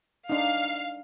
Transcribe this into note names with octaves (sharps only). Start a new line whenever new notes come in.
D4 D#4 F5